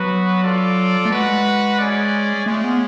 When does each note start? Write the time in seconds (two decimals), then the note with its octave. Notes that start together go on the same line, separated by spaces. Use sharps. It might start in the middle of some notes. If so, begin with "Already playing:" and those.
Already playing: F#3 B3 F#4 B4
0.43 F4 A4 D5
1.05 A3
1.11 G#3 F#4 B4 F#5
1.79 C#4 G#4 D5
2.46 G#3 A3 C#4 F4
2.64 B3